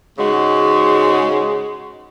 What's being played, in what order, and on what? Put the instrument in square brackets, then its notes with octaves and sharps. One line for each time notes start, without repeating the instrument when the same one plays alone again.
[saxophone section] G#2 C#3 G#3 F#4